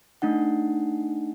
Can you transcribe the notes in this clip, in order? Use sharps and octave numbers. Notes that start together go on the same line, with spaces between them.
A3 D4 D#4 F#5